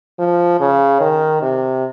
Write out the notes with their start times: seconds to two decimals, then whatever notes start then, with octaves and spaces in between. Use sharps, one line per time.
0.19 F3
0.60 C#3
1.00 D#3
1.42 C3